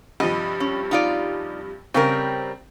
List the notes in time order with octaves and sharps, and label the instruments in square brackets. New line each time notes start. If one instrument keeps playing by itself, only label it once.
[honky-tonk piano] G2 C3 F3 [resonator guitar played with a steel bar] D#5
[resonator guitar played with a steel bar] C#4
D#4 F4 D5
[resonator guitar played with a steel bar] C#3 G3 A#4 [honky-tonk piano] C4